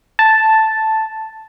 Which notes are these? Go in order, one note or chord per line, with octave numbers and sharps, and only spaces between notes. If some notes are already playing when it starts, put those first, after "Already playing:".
A5